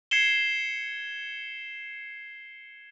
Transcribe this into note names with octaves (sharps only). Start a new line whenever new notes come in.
G#6 C7 C#7 E7 G7